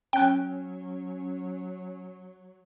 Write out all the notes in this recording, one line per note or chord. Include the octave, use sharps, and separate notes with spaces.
F#3 C#4 G5 F#6